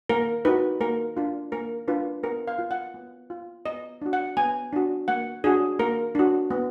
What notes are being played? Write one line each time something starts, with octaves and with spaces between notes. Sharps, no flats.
A#3 A#4
D#4 F#4 B4
A#3 A#4
D4 F4
A#3 A#4
D4 F4 B4
B3 A#4
F5
F4
F#5
B3
F4
B3 D#5
D4 F#4
F#5
B3 G#5
D4 F#4
A#3 F#5
D4 F#4 G#4
A#3 A#4
D4 F#4
B3